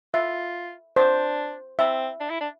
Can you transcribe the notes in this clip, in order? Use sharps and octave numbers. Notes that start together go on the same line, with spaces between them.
F4 E5
D4 C5
C4 E5
D4
E4
D4